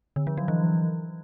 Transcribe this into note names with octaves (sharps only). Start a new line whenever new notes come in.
D3
F3
F#3
E3